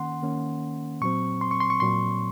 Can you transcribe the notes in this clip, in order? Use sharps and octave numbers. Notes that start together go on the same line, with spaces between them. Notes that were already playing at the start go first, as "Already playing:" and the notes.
Already playing: D#3 A#3 C#4 F#5 C6
D#3 A#3 C#4
A#2 F#3 C4 C#6
C6
C#6
C6
C#6
A#2 F#3 C6